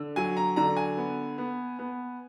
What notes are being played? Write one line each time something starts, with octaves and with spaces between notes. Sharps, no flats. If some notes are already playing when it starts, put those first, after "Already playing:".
Already playing: D3
F#3 G#5
A#5
D3 A#5
G#5
B3
B3
B3